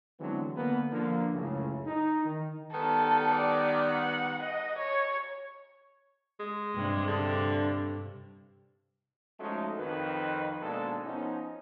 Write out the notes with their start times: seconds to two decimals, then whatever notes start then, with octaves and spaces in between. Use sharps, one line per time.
0.19 D3 E3 F#3 G#3 B3 C4
0.56 D3 A#3 B3
0.92 D3 F3 A#3
1.33 C#2 F#2 A2 C#3
1.86 D#4
2.24 D#3
2.74 D#3 G3 B3 A4
3.35 D5
3.91 F#5
4.43 D#5
4.79 C#5
6.39 G#3
6.75 G2 C3
7.07 D3
9.40 F3 G#3 A3 C#4 D#4 F#4
9.79 F2 D#3 B4
10.61 G#1 B2 G#3 A#3 D4 A4
11.06 F3 B3 C#4 D#4